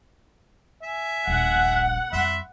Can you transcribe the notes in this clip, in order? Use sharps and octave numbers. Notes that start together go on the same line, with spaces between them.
E5 G#5
D#1 A#1 F#5
F2 G3 E5 B5 C6